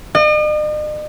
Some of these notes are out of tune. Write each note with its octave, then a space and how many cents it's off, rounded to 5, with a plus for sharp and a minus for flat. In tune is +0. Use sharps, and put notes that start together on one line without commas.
D#5 -45